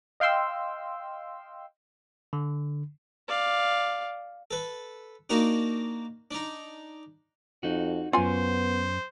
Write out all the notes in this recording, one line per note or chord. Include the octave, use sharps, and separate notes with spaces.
D#5 F5 G5 C6 E6
D3
D5 F5
A4 B4
A#3 D4 D#4 F#4
D4 D#4
F2 D#4 F#4
F#2 B3 C#4 F4 C5 G#5